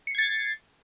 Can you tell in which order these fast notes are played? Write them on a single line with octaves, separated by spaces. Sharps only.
C#7 C7 G#6 A6